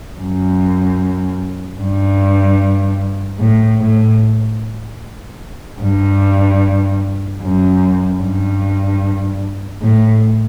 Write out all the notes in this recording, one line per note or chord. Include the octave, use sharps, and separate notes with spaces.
F#2
G2
A2
A2
G2
F#2
G2
A2